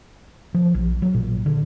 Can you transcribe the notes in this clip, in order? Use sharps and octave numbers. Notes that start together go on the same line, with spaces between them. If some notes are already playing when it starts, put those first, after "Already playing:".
F3
A#1
F#3
A#2
D3